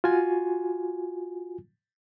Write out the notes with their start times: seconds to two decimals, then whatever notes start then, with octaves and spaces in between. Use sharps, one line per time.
0.04 F4 F#4 G#5